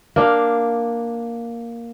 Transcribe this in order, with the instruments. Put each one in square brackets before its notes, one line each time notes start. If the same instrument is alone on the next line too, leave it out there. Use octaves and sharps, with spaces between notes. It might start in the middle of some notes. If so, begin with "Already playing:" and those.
[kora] A#3 D4 F5